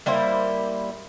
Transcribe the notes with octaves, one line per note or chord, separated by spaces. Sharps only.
G3 A#3 E4 C5